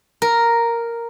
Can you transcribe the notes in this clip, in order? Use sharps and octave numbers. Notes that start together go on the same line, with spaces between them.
A#4